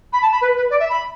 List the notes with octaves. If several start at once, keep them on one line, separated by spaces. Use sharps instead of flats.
B5
A5
B5
B4
B4
D5
E5
B5